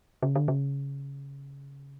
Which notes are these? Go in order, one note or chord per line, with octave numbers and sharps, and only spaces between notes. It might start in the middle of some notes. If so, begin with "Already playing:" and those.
C#3
D3
C#3